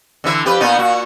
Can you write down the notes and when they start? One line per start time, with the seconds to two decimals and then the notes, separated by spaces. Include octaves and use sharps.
0.24 D3 E3 E5
0.45 F2 G4 B4
0.60 A#2 B3 D#4
0.79 A#2 F#4